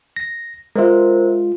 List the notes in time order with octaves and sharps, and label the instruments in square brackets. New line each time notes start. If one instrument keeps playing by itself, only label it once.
[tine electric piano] A#6
[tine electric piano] G#3 F4 [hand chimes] A#4 C5 E5